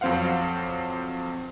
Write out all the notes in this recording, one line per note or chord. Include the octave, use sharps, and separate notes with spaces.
F2 F#3 C4 C5 F5 F#5